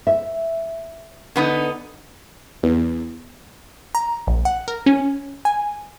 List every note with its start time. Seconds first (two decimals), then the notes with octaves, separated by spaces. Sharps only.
0.07 E5
1.36 D3 B3 D#4
2.63 E2
3.95 A#5
4.27 A#1
4.45 F#5
4.68 A#4
4.86 C#4
5.45 G#5